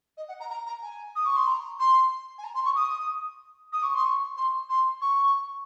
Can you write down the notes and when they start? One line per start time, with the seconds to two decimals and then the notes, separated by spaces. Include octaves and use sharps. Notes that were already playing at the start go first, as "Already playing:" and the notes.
0.17 D#5
0.28 F#5
0.40 A#5
0.50 A#5
0.66 A#5
0.82 G#5
1.15 D#6
1.25 C#6
1.36 C6
1.47 A#5
1.79 C6
2.38 G#5
2.44 A#5
2.54 C6
2.65 C#6
2.75 D#6
3.72 D#6
3.83 C#6
3.94 C6
4.05 C#6
4.37 C6
4.69 C6
5.01 C#6